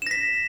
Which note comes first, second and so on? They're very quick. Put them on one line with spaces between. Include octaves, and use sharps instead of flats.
E7 A#6 B6